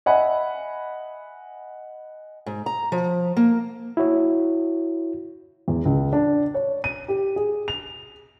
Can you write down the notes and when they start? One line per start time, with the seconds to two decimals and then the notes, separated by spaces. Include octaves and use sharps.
0.06 D#5 E5 F#5 G#5 B5
2.46 G#2
2.66 A#5
2.92 F3
3.37 A#3
3.97 E4 F#4 C#5
5.68 E2
5.86 C#2
6.13 D4
6.54 C#5
6.84 D#7
7.08 G4
7.36 G#4
7.68 F7